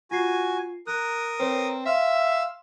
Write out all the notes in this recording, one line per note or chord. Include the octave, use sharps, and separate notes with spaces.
F4 F#4 G#5 C7
A#4 D#6 F#6
C4 B4 C#5
E5 F5 C6 E6